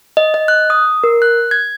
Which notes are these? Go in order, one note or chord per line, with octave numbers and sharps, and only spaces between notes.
D#5
D#5
F#6
D#6
A#4
F#6
G#6